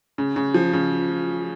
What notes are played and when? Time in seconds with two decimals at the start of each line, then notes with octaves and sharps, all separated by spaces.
0.18 C#3
0.36 C#3
0.54 F3
0.73 C#3